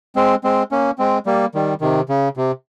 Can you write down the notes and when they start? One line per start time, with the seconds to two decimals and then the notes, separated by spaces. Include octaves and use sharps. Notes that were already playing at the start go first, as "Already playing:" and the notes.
0.16 G#3 C4
0.44 G#3 C4
0.72 A#3 C#4
0.98 G#3 C4
1.26 G3 A#3
1.55 D#3 G3
1.81 C3 D#3
2.09 C#3
2.37 C3